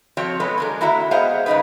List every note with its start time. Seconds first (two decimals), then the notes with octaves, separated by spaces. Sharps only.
0.17 F3 C4 F#4 C#5
0.40 F#3 G#3 B3 A4 B4
0.58 D3 G#3 A#4
0.81 E3 A#3 E4 F#4 E5
1.11 G#3 B3 G#4 C5 F5 F#5
1.46 G2 C#3 G#3 D#4 G#4 B4